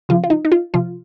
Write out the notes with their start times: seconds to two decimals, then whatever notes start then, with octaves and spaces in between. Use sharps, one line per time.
0.09 C#3 F3 F4
0.24 F4
0.30 D#4
0.45 D#4
0.52 F4
0.74 C3 F3 F4